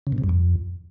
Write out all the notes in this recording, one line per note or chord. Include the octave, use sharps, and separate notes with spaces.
C#3
A#2
C3
G2
F2